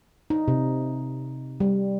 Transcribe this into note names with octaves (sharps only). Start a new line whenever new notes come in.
D#4
C3
G3